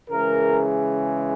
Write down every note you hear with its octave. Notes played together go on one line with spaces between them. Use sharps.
C#3 E3 G#3 A#4